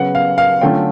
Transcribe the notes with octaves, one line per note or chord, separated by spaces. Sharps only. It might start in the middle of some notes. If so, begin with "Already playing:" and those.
Already playing: C#3 F#3 B3 F#5
F5
F5
D3 F#3 A3 C#4 F4 G5